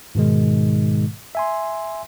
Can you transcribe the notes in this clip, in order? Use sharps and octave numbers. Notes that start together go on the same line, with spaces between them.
G#2 B2 D#3 G#3
E5 G#5 C6